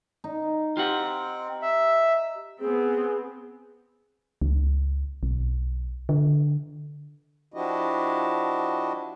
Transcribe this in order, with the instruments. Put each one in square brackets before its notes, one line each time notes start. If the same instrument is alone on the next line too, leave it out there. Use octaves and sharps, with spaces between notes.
[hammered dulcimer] D#4
[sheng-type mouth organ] C4 [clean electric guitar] F4 G4 F#5
[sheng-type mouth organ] E5
[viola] B3 C4 [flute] G#4
[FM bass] C#2
B1
D3
[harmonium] F3 D4 E4 F#4 G4 D#5